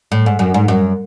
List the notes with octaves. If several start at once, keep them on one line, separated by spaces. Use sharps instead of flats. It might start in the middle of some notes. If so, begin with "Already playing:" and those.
A2
G#2
F#2
G#2
F#2